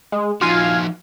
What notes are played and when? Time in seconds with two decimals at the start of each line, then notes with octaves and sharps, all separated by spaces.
0.12 G#3
0.41 F3 D#4 F4 F#4 F5 G#5